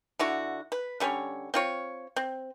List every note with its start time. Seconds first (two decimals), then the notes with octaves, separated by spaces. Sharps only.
0.19 D3 E4 F#4
0.72 B4
1.00 D3 G3 C#4 C#5
1.54 C4 F4 C#5
2.16 C4